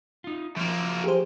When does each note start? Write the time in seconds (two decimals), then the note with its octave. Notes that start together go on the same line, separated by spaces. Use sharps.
0.24 D#4 F4
0.57 F#2 F3 A#3
1.04 G4 G#4 C5